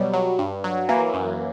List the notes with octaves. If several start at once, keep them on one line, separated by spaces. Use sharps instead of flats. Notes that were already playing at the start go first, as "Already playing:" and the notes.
Already playing: B2 F#3 G3
F#3
G2
F#3
E3 A#3
F#2